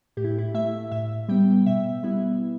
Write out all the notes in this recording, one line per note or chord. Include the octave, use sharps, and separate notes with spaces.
A2 G4
E4
E4
A3 E5
A2 E5
G3 B3 G5
B2 E5
G3 B3 E4